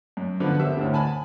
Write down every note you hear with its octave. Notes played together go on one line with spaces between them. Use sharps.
F#2
D3 F3 B3
G4 C5 E5 E6
D2 A2 D3
G#5 A5 B5